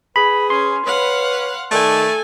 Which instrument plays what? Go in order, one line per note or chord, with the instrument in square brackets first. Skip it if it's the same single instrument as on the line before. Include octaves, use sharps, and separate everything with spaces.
[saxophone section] G#4 B4 [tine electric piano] B5
[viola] C#4 [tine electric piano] C6
[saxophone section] B4 C#5 [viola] F5 F#5
[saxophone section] D#3 D5 [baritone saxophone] A3 [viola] A4 G#5